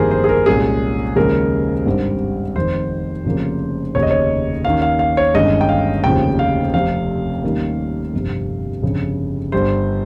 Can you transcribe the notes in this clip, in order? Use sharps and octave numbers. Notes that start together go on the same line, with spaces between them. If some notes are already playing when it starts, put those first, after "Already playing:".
Already playing: G1 F2 D#3 G3 A#3 G#4 A#4 C5
C5
G#4
A#4
C2 A#2 G#3 C#4 G#4
D#2 C#3 F3 G#3 A#4
G#1 G2 G3 C4
F1 F2 D#3 C5
F1 F2 C#3 F3 A#3
F1 D#2 C#3 C#5
D#5
C#5
D#2 D#3 A#3 C#4 F5
F5
F5
C#5
G1 G2 D#3 G#3 C#4 D#5
G5
F5
F1 D#2 C#3 F3 G5
F5
F1 F2 C3 F5
D#2 D#3 G3 A#3 C#4
G1 F2 C3
G1 F2 C#3
G1 G2 G3 C5